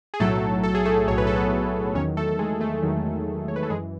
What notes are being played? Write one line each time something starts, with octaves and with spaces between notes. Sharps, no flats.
G#4
B1 A2 F#3 A3 A4
A4
G#4
A3 A4
B1 A2 F#3 C#5
B4
A4
B3 B4
E2 D#3 F#3 C#4 C#5
A3 A4
G#3 G#4
A3 A4
E2 D#3 F#3
C#5
B4
A4
F#2 E3 G#3 G#4